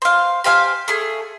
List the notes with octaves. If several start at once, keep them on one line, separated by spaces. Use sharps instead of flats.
C5 F5
G4 C5 F5 G#5
A3 G#4